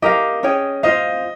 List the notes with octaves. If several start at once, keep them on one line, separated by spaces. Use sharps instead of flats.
G4 A#4 D#5 F5
C#4 G#4 C#5 G5
F4 C5 D#5 F5